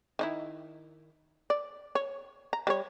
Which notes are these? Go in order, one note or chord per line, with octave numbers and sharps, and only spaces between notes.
D#3 D#4 E4
D5
C#5
A#5
G3 B4 C#5